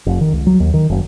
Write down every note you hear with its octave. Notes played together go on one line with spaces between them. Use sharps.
F1
D#3
C#2
F#3
D#2
D#3
F#1